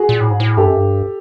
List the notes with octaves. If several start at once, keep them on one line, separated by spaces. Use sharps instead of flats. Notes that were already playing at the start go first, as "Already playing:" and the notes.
Already playing: F#4 G#4
A#2
A2
G#2
A2
G2 G4 A4
F#2
G2